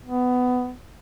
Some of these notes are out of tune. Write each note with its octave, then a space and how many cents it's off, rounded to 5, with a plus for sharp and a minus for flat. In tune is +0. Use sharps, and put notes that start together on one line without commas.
B3 +15